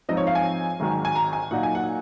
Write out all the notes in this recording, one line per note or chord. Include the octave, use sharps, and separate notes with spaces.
G#2 F3 C4 D#4 D#5
C#5
F5
G#5
G#1 G#2 D#3 F#3
G#5
A#5
G#5
A#2 F#3 A#3 D#4 F#5
G#5
F#5